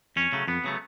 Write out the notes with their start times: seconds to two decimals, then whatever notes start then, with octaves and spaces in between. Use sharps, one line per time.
0.16 F2 C#4
0.33 C#3 F#3 A3
0.48 F2 B3
0.64 C#3 F#3 A3